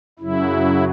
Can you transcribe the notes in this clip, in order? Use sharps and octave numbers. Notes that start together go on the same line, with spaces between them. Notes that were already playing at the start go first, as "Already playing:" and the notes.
F#2 C#3 F#3 E4